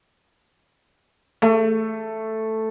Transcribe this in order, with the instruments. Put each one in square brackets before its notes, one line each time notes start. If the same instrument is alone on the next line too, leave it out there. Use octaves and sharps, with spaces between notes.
[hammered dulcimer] A3